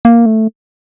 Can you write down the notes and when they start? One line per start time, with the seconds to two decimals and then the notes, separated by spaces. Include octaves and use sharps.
0.05 A#3
0.26 A3